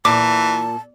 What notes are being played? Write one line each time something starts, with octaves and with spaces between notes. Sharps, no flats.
A#2 E3 A5 D6